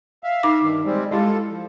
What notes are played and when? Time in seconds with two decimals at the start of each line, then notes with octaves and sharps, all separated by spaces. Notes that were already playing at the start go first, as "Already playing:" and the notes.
0.24 E5 F5
0.43 D#4 D6
0.61 G2 D#3
0.85 G3 G#3 C4
1.11 G#3 E4 F4 G4 A4
1.50 F3